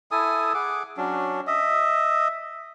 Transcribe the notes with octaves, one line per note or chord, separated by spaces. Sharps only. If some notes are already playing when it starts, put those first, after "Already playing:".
E4 A4 G#5 D#6
G#4 F#5 D6
F#3 C#4 D4
D#5 E5